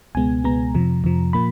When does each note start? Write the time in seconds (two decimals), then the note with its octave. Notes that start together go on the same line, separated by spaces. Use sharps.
0.15 C#2 B2 G#3 B3 G#5
0.44 C#2 B2 G#3 B3 A#5
0.75 F2 C3 F3
1.04 F2 C3 F3
1.33 A#2 F3 A#3 B5